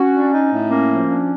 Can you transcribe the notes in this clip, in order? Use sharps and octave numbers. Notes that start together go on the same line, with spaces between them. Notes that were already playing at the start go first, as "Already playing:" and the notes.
Already playing: C#4 F#4
D4
D#4
A2
A#3 C#4
F3
D4